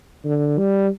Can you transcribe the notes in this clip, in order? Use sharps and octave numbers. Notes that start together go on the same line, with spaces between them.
D3
G3